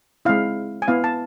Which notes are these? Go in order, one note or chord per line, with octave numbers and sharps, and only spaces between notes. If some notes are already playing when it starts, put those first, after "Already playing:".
G#3 C4 E4 F5
G#5
B3 E4 F5
A5